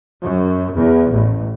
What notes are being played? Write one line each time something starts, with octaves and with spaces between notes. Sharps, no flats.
F#2
E2
A1